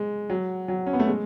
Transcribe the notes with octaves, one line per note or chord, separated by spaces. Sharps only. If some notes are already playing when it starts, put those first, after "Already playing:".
Already playing: G#3
F#3
F#3
C#4
B3
A3
G#3